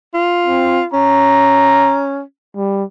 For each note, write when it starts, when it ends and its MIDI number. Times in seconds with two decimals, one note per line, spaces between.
0.14 0.86 65
0.47 0.82 60
0.93 2.20 61
0.93 2.04 82
2.56 2.84 55